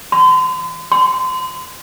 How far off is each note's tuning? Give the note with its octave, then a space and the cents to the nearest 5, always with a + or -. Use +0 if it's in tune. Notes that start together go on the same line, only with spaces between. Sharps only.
C6 -40
C6 -35